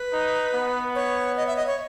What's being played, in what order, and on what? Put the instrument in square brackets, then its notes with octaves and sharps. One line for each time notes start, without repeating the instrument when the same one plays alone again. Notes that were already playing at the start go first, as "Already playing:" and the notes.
Already playing: [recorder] B4
[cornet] D#4
B3
[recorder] C#5
D#5
E5
D#5
C#5